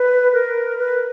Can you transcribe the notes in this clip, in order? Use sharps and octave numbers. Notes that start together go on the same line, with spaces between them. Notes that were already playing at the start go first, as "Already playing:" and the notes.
Already playing: B4
A#4
B4